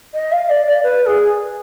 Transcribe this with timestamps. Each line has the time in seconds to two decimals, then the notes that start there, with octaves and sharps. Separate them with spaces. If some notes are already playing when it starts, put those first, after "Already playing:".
0.14 D#5
0.32 F5
0.49 D5
0.66 D5
0.83 B4
1.06 G#4